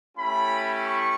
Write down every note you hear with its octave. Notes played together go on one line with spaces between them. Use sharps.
A3 C#4 E4 G4 B5
C#6